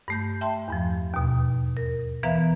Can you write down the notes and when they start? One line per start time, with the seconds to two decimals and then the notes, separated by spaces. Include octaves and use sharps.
0.08 G2 A3 G6
0.41 E5 G5 A5 C6
0.68 E2 G2 F3
1.14 D#2 B2
1.77 A#4
2.23 E3 B3 B4 E5 F5 A#5